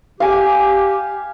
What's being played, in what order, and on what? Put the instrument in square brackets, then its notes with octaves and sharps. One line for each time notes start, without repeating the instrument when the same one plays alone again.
[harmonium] G4 [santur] F5 G#5